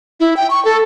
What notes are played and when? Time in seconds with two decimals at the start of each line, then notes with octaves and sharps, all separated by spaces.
0.20 E4
0.37 G5
0.50 C#6
0.65 A4